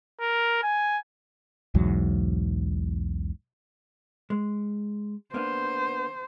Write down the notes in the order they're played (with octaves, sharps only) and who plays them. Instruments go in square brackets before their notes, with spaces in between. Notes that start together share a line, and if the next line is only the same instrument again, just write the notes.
[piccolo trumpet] A#4
G#5
[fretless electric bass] B1 E2 G#2 F#3
[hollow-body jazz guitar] G#3
[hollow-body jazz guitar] A#3 B3 D4 [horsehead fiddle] C5